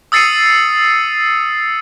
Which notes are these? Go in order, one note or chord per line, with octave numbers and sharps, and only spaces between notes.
D#6 E6 A6 C7 C#7 D#7